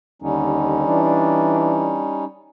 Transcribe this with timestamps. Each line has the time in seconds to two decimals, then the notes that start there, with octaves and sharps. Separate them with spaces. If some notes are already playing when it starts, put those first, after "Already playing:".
0.22 D#2 D3 G3 C#4 D#4
0.87 E3 D4